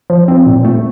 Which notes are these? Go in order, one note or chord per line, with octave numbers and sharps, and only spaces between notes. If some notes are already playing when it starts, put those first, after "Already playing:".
F3
C4
A#2
A3